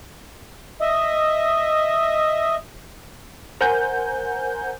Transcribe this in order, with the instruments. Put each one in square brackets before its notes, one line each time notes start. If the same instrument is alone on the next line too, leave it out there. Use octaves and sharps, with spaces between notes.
[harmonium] D#5 E5
[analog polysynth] A#4 C5 F#5 G#5 G6